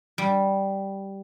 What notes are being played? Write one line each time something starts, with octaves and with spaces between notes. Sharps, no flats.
G3